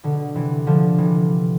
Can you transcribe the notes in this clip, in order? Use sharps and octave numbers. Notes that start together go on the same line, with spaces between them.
B2 D3
C3 E3
D3 F3
C3 E3